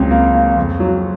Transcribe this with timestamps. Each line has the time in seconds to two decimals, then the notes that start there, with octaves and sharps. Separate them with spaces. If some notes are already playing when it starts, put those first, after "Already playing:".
Already playing: C#2 F#3 C4
0.11 A#3
0.34 A#3
0.57 F2
0.80 F#3